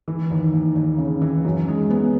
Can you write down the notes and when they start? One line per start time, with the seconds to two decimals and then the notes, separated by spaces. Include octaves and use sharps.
0.08 E3
0.30 D#2
0.53 D#2
0.75 D#2
0.98 C#3
1.22 E3
1.45 F#2
1.68 G#3
1.90 B3